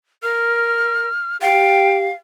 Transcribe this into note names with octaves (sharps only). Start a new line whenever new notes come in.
A#4 F6
G4 F5 G5